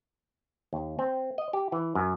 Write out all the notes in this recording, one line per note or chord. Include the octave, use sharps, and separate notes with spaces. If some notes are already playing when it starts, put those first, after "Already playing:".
D#2
C4
D#5
G4
E3
F#2